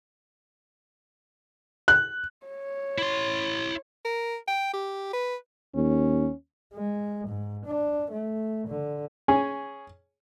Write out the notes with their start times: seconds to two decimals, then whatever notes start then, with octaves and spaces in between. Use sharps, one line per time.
1.88 F#6
2.47 C#5
2.98 E4 C6
4.05 A#4
4.48 G5
4.73 G4
5.13 B4
5.75 D#2 C#4
6.74 G#3
7.28 G#2
7.66 D4
8.11 A3
8.68 D3
9.28 C#4 G#4